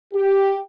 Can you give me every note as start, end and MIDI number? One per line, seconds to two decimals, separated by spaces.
0.13 0.60 67